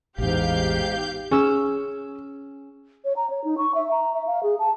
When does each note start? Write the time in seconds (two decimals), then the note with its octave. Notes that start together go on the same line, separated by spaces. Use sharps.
0.18 A1 E2 G#2 G4 F5 G6
1.31 C#4 G#4 E6
3.05 C#5
3.16 A#5
3.30 C#5
3.44 D#4
3.58 C#6
3.75 E5
3.91 A#5
4.14 E5
4.27 F5
4.43 G#4
4.59 A5